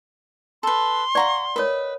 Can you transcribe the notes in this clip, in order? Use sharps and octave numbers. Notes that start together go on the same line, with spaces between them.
A4 B4 C6
D5 F5 F#5 A#5 C#6
A#4 B4 C#5 D#5